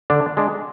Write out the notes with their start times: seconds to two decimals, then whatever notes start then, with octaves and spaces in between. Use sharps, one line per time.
0.10 D3 D4
0.37 G#3 D4